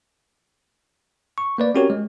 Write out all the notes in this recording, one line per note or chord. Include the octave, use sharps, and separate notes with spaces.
C#6
A#3 B4 D5
C4 C#4 F#4 G4 A#4 C#5
G#3